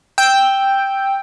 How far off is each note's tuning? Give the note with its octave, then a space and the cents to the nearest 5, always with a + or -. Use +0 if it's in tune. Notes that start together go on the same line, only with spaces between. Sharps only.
G5 +0 E6 -5